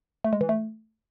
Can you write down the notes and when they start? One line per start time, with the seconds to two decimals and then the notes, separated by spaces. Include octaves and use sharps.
0.24 A3
0.33 G#3
0.41 E3
0.49 A3